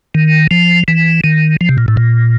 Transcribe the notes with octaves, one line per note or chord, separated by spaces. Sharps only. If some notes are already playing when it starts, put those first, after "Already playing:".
D#3
F3
E3
D#3
F3
C3
A#2
A2
A#2